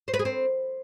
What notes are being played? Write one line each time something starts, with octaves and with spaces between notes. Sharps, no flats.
C5
B4
G#4
C4